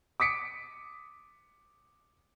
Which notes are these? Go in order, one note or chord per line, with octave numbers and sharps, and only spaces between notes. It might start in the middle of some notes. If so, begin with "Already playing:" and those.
D6 D#6 B6 C#7 D7